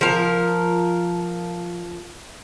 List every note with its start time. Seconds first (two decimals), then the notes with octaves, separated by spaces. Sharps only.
0.01 F3 A#4